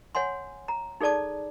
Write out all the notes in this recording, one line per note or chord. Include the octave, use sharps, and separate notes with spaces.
C#5 F#5 G#5 C6
A#5
D#4 G#4 A4 D5 A5 D6